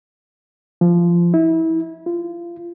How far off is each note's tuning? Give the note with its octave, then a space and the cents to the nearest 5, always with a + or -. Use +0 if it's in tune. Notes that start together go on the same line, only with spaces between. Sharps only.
F3 -20
E4 -25
F4 -30